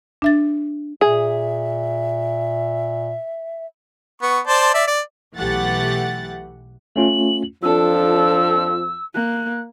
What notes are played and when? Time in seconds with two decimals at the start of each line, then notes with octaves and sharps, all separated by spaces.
0.22 D4 E5 A6
1.01 A#2 G#4 E5
4.22 B3 C#6
4.47 C5 D5 A5
4.74 D5 E5
4.87 D5
5.37 B1 E3 A3 G4 F#5 A6
6.96 A3 C#4 F4 F#7
7.63 F2 F3 D4 F4 A4 E6
9.14 A#3 F#6